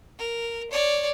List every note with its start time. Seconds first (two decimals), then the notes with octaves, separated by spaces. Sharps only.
0.19 A#4
0.71 C#5 D5